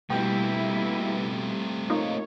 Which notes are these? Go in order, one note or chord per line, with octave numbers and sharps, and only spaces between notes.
B2 G3 A3 A#3 C4 E4 G4
A#3 D#4 F4 C#5